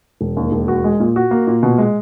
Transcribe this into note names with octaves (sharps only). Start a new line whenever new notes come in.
E1
D#2
E1
F#4
G#3
A#2
F#4
A#3
A#2
B2
G#3